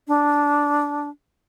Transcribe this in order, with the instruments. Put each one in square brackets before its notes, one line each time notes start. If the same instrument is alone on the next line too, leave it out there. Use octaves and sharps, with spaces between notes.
[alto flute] D4